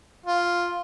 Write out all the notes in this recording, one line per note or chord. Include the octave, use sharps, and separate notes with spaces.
F4